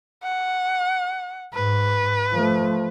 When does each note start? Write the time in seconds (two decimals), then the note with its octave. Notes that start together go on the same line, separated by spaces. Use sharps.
0.23 F#5
1.54 G#2 B4
2.33 F3 A3